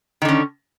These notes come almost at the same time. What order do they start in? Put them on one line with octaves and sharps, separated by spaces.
D#3 D3 C#4